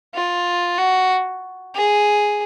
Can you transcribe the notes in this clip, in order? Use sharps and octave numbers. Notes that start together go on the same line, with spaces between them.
F4
F#4
G#4